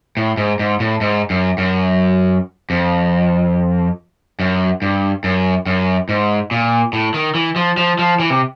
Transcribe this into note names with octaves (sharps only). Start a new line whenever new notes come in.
A2
G#2
G#2
A2
G#2
F#2
F#2
F2
F#2
G2
F#2
F#2
G#2
A#2
A2
D#3
E3
F3
F3
F3
E3
C3